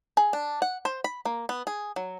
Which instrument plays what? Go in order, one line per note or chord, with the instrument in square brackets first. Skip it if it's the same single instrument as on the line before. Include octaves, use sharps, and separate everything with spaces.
[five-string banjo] G#4
D4
F#5
C5
B5
A#3
B3
G#4
F#3